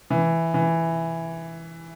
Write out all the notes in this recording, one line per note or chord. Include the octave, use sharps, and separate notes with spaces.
E3
E3